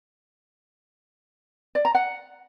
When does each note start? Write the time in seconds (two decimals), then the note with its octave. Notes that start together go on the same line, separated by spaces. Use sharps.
1.75 D5
1.85 A#5
1.95 F#5